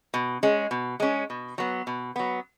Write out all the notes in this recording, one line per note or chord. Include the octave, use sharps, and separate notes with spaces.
B2
G#3 C#4
B2
G#3 C#4
B2
F#3 B3
B2
F#3 B3